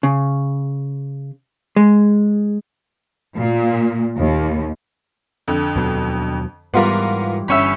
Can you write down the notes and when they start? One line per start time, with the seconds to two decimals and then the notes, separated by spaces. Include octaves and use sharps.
0.03 C#3
1.76 G#3
3.38 A#2
4.18 D#2
5.48 F2 D3
5.76 D#2 B2 F#3
6.74 G#2 E3 G3 B3 F4 A#4 C6
7.48 G1 C#4 E5 B5 C#6 E6